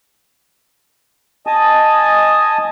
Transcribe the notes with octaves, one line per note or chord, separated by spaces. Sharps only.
D#5 G#5 A5 D#6